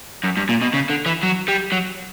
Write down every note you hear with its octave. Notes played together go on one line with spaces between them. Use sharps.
F#2
G2
A#2
B2
C#3
D3
E3
F#3
G3
F#3